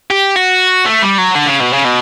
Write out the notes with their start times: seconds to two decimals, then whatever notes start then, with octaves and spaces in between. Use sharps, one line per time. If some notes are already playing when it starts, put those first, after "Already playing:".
0.11 G4
0.36 F#4
0.86 A3
1.02 G3
1.18 F#3
1.35 D3
1.47 C#3
1.60 B2
1.73 C#3
1.85 B2